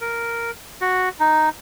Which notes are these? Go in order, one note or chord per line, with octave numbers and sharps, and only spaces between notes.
A#4
F#4
D#4